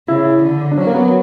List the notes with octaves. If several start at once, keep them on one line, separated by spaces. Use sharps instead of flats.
C#3 E4
D3
D4
F#3 C#4
A#3
B3